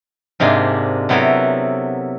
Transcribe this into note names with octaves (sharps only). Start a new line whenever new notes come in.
G#2 C3 G#3 A#3 D4
C3 F#3 B3 E4 A4 A#4